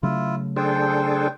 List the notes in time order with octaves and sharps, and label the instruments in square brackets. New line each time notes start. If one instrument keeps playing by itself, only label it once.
[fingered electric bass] C#3 F#3 A3 [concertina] E4 F4
[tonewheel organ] D4 G#4 A4 [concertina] C5 G5